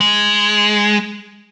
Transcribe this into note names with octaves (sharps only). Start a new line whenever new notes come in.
G#3